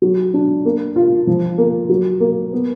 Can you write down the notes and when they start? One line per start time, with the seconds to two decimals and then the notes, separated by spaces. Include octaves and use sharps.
0.02 F#3
0.34 D4
0.65 A#3
0.96 F4
1.27 F3
1.58 A#3
1.89 F#3
2.20 A#3
2.53 B3